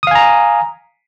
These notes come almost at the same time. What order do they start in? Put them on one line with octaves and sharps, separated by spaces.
D#6 F5 G#5 A#5